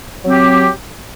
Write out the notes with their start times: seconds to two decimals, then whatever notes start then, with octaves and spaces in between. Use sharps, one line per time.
0.22 F#3
0.27 C4
0.31 G4